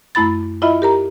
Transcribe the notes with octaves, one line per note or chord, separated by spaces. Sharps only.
F#2 A3 E4 B5 A6
E4 F4 D#5 E5 B5
G4 A#4 A#5